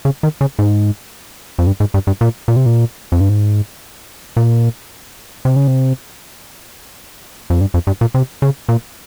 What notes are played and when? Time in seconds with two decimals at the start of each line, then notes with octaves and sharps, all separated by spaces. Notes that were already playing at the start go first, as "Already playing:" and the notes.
0.05 C#3
0.23 D#3
0.41 C#3
0.59 G#2
1.59 F2
1.67 G2
1.80 G#2
1.94 G2
2.07 G2
2.21 A#2
2.48 A#2
2.56 C3
2.66 A#2
3.12 F2
3.21 G2
3.29 G#2
4.37 A#2
5.45 C3
5.56 C#3
5.68 C3
7.50 F2
7.61 G2
7.74 F2
7.87 G2
8.01 A#2
8.14 C3
8.42 C#3
8.69 A#2